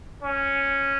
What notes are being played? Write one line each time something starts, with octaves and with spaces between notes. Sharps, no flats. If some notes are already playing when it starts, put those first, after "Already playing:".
C#4